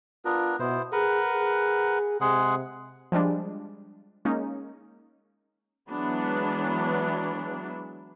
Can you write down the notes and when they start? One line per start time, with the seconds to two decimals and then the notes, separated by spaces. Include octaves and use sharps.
0.25 B3 D4 F4 A#4
0.59 B2 B3 E4 C5
0.92 G#4 A#4 B4 F#5
1.32 G#4
2.21 C3 G#3 G#4 F#5
3.12 F3 G3 G#3 D4
4.25 G#3 A#3 C#4 D#4
5.89 E3 F#3 G#3 B3 D4